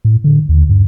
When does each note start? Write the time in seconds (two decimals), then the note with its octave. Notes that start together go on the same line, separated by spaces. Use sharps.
0.05 A2
0.24 D3
0.49 D#2
0.69 G2